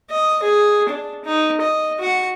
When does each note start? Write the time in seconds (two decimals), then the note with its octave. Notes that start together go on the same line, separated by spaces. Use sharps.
0.11 D#5
0.42 G#4
0.89 D4
1.25 D#4
1.61 D#5
1.99 F#4 F#5